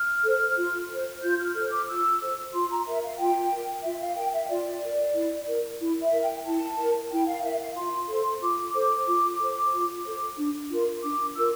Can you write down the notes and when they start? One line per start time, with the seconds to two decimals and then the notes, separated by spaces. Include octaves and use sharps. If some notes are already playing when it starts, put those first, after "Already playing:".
Already playing: F6
0.25 A4 C5
0.57 F4
0.89 A4 C5
1.22 F4 G6
1.40 F6
1.55 A4 C5 F6
1.71 D6
1.88 F4 E6
2.21 A4 C5
2.53 F4 C6
2.70 A#5
2.86 A#4 E5
3.03 F5
3.19 F4 G5
3.52 A#4
3.84 F4 E5
4.01 F5
4.16 A#4 G5
4.34 E5
4.49 F4 D5
4.82 A#4
5.15 E4
5.47 A#4
5.80 E4
6.02 E5
6.13 A#4
6.24 G5
6.45 E4 A5
6.78 A#4
7.11 E4 G5
7.27 F5
7.43 A#4 E5
7.60 F5
7.76 F4 C6
8.09 A4 C5 C6
8.42 F4 D6
8.74 A4 C5
9.07 F4
9.40 A4 C5
9.72 F4
10.05 A4 C5
10.37 D4
10.70 F4 A#4
11.03 D4 D6
11.36 F4 A#4 E6